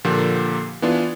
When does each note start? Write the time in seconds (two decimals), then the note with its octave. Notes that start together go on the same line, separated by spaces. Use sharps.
0.04 A#2 D3 F3 A#3 G4
0.82 E3 B3 D4 F4